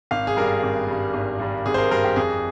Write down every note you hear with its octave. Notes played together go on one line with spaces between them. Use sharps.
G#1 F5
G#4
G2 G3 A#4
G#1
G2 G3
G#1
G2 G3
G#1 G#4
C5
A#4
G2 G3 A#4
G4
F2 G#4